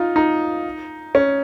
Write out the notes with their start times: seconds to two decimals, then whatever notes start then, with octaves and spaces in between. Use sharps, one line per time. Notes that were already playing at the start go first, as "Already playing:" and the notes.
Already playing: D#4 F4
0.16 D#4
1.15 C#4